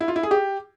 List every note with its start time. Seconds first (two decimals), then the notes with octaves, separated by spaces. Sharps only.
0.01 E4
0.08 F4
0.16 E4
0.23 G#4
0.31 G4